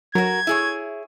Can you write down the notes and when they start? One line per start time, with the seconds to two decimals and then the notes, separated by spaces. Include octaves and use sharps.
0.15 F#3 F#4 A#4 G#6
0.47 E4 G#4 C#5